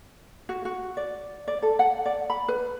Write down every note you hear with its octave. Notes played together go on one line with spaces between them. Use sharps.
F#4
F#4
D5
D5
A4
F#5
D5
B5
B4